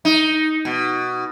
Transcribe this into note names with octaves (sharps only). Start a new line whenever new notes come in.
D#4
B2